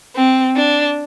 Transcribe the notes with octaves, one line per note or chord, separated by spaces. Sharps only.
C4
D4